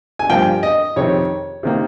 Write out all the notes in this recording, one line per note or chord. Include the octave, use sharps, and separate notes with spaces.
G#5
G2 F3 A#3 G5
D#5
F2 C3 D#3 C#5
C3 D#3 A#3